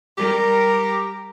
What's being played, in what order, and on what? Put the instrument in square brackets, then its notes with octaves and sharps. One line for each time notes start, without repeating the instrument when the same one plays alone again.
[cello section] G3 A#4 [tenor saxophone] G4